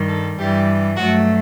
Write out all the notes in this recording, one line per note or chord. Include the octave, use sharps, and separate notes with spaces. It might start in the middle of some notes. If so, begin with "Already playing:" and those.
Already playing: G2 D#3 G3
A4
G2 E3 G3 G4
G2 F#3 A3 F#4